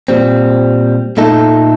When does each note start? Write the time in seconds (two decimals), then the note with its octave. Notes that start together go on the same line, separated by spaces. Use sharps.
0.08 A#2 G3 C4
1.17 A#2 A3 D#4 A4